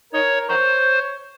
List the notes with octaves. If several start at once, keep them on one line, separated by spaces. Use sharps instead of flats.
D#4 A#4 C#5
A#4 C5 C#5